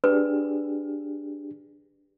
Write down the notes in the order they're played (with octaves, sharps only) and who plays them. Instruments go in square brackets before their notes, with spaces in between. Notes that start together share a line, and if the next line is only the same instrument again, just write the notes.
[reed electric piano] D4 G4 G#4 [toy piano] B4